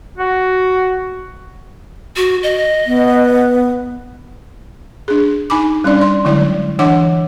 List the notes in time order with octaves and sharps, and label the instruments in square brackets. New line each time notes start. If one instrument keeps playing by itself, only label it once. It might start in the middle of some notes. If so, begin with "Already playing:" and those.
[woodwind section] F#4
[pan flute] F#4
D#5
[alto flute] B3
[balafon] D4 G#4
D#4 G#5 B5 D6
G3 C#4 D4 D5
C6
D3 F#3 G#3 E4 D5
E3 D4 C#5 F#5 D6